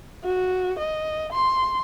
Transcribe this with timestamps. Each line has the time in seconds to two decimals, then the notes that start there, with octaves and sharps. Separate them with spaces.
0.24 F#4
0.79 D#5
1.33 C6